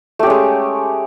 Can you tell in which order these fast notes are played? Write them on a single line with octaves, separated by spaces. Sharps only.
A3 G4 C#4 G#3